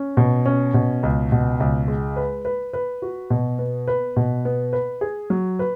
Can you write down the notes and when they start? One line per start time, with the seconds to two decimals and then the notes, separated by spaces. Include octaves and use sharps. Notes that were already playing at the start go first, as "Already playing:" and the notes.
Already playing: C#4
0.17 B2
0.46 C#4
0.74 B2
1.03 C#2
1.32 B2
1.60 C#2
1.88 G#3
2.16 B4
2.45 B4
2.73 B4
3.02 F#4
3.30 B2
3.59 B3
3.88 B4
4.16 B2
4.45 B3
4.73 B4
5.01 G#4
5.30 F#3
5.59 B4